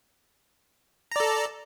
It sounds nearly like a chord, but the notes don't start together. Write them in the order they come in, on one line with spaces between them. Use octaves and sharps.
A#5 D5 A4